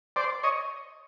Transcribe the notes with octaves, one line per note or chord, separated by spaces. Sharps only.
C5 D5
C#5 D#5